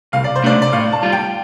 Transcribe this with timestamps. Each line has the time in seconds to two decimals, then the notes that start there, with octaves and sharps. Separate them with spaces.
0.13 C2 F5
0.24 D5
0.35 C5
0.43 C3 A3 D4 D5
0.62 D5
0.72 A2 F5
0.92 A5
1.03 G3 F4
1.12 G5